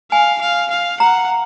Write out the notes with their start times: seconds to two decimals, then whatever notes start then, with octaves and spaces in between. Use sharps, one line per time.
0.11 F5 G#5
0.41 F5
0.71 F5
1.00 F#5 A#5